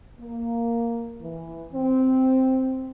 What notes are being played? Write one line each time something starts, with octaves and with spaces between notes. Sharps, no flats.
A#3
E3
C4